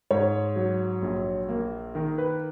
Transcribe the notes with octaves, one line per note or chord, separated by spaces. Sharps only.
G#2 C#5
F#3
A#1
A#3
D#3 A#4
B4